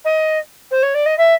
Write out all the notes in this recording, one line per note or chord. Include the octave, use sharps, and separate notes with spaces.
D#5
C5
C#5
D5
D#5
E5